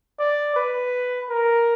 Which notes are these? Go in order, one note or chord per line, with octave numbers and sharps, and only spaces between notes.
D5
B4
A#4